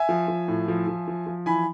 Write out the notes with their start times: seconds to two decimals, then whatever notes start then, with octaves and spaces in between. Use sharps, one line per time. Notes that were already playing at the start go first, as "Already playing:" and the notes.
Already playing: E5 G#5
0.09 F3
0.28 F3
0.48 A2
0.68 F3
0.87 F3
1.08 F3
1.27 F3
1.46 E3 G#5 B5